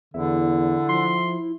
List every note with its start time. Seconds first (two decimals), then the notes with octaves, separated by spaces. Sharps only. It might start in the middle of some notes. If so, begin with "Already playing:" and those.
0.14 E2 D3 E4
0.89 F3 C6